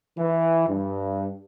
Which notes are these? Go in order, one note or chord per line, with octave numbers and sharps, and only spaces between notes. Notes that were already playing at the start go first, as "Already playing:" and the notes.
E3
G2